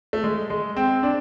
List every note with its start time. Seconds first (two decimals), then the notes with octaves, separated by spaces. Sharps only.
0.13 A3
0.24 G#3
0.50 G#3
0.77 C4
1.03 D4